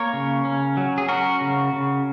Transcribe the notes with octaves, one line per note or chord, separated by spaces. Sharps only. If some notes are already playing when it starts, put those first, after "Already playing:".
Already playing: A#3 A#4 C#5
C#3
C#4
F#3
G#4
C#4 F#4 A#4
C#3
C#3